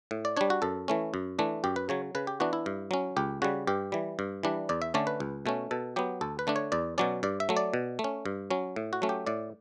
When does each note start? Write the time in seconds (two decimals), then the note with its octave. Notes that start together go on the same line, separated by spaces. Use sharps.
0.11 A2
0.25 D5
0.37 G3 D4 C#5
0.50 F#4
0.62 F#2 A4
0.88 E3 A3 C#4
1.14 F#2
1.39 E3 A3 D4
1.64 F#2 G4
1.76 B4
1.89 C#3 F#3 C#5
2.15 C#3 B4
2.27 G4
2.40 E3 B3 D4 F#4
2.53 E4
2.66 G2
2.91 F#3 C#4
3.17 C#2 G4
3.42 C#3 G3 F#4
3.67 G2 G4
3.92 E3 G3
4.19 G2
4.43 E3 G3 D4
4.69 E2 D5
4.82 E5
4.94 D3 A3 C#4 D5
5.07 B4
5.20 C#2
5.46 B2 A3 C#4
5.71 B2 A4
5.96 F#3 B3 G4
6.21 D2 A4
6.39 B4
6.47 D3 A3 D4
6.56 C#5
6.72 E2 D5
6.98 B2 F#3 C#4 D5
7.23 G2 D5
7.40 E5
7.49 F#3 A3
7.57 D5
7.74 B2
7.99 A3
8.04 C#4
8.26 G2
8.51 F#3 C#4
8.76 A2
8.93 F#4
9.02 F#3 A3 C#4
9.09 G4
9.27 A2 D5